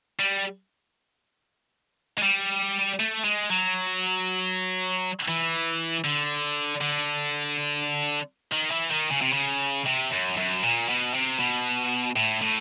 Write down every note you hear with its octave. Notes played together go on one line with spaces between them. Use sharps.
G3
G#3
G3
A3
G#3
F#3
E3
D3
D3
D#3
E3
D#3
C#3
C3
C#3
C3
F#2
F#2
A#2
B2
C3
B2
A2
A2